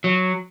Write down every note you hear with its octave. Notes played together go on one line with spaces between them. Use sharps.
F#3